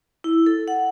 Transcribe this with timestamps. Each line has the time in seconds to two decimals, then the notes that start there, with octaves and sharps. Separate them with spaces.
0.24 E4
0.46 A4
0.68 F#5